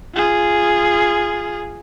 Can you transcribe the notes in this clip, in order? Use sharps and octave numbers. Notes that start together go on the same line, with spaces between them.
F4 G#4